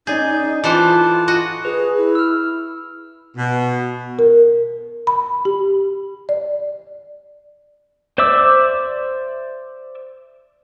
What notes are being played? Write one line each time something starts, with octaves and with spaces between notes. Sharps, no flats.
C#4 D#4 G#4 D5 G6
E3 F4 A4 C5 D6 F#6
F#4 D#5
G#4 B4
E4
E6 F6
B2
A#4
B5
G4
D5
C5 D5 E5 D6 E6